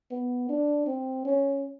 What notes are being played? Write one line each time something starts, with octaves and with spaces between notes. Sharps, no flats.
B3
D4
C4
C#4